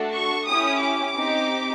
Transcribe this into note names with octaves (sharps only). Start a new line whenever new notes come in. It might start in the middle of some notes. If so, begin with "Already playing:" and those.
Already playing: A3 D4 F#4 A4
C#6
C#4 E4 G4 D#6
D6
C4 D#4 G4